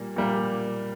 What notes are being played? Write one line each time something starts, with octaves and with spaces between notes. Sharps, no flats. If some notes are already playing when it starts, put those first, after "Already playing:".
Already playing: A#2 G3 A#3
A#2 G3 A#3